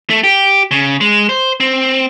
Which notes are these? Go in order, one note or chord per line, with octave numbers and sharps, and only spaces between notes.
A3
G4
C#3
G#3
C5
C4